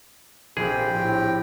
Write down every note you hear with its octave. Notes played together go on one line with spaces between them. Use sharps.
A#1 C4 G4 G#4 G5
A2